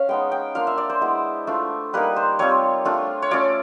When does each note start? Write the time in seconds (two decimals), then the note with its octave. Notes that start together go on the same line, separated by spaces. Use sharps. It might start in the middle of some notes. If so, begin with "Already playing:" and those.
Already playing: C#4 F5
0.08 G#3 B3 D#4 G5
0.32 G5
0.55 A#3 D4 F4 F5
0.67 E5
0.78 D5
0.90 C5
1.01 G#3 B3 E4
1.47 A3 D4 F4
1.93 G3 A#3 D#4 B4
2.16 C5
2.39 G3 C4 F4 C#5
2.85 A3 D4 F4
3.22 C#5
3.31 A3 C#4 F4 D5